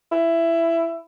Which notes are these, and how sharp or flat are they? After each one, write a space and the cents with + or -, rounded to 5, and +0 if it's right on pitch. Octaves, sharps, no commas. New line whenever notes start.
E4 +15